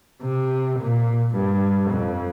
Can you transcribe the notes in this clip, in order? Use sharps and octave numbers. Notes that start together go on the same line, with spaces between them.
C3
A#2
G2
F2